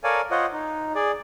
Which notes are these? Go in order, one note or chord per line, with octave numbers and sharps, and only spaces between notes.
A4 A#4 C#5 D5 F5 G#5
F4 C5 C#5 D#5 F#5
D#4
G#4 D5